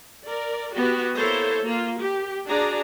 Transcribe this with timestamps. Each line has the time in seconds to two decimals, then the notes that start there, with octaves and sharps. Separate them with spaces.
0.24 A#4 D5
0.74 B3 F#4 G4
1.16 A#3 E4 A4 C5 C#5
1.64 A#3 F4
1.98 G4
2.46 D4 F#4 G#4 D5 A#5